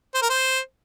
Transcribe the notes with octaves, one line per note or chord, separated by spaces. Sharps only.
C5
A#4
C5